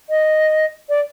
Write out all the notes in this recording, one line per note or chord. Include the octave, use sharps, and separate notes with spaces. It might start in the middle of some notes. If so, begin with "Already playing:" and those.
D#5
D5